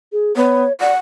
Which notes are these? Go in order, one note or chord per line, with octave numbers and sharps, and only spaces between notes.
G#4
B3 C#5
D5 F#5